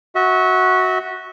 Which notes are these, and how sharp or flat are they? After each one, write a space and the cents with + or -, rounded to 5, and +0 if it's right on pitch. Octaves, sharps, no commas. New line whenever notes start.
F#4 +0 E5 -35